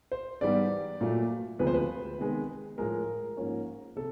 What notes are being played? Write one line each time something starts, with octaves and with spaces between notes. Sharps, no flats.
C5
G#2 E3 G3 B3 D5
A#2 F#3 A3
D2 C3 F3 G#3 B3 B4
C5
B4
C3 D#3 G#3 B3
A2 F3 G#3 A#4
G#2 F3 A#3 C#4
C3 A4